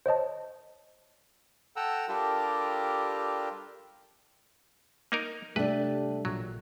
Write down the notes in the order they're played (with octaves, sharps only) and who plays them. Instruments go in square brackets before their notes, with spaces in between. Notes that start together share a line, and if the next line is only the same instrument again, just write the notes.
[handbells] C5 C#5 D#5 A5
[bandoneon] A4 F#5 G5 A#5 E6
G3 D4 F4 G4 A4 A#4
[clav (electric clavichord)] A#3 D#4 A#4
[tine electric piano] C3 G5 [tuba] G3 [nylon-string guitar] A3 D4 [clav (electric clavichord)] B4
[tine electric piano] A1 A#2 [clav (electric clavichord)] F#3